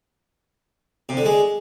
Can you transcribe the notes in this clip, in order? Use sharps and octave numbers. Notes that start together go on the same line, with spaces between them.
C3
D3
G#3